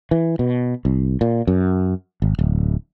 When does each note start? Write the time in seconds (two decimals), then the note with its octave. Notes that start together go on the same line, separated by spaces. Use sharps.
0.11 E3
0.39 B2
0.85 C2
1.21 A#2
1.47 F#2
2.22 G#1
2.39 D1